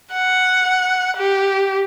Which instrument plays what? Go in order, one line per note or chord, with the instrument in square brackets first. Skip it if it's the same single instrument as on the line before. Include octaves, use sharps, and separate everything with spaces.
[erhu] F#5
G4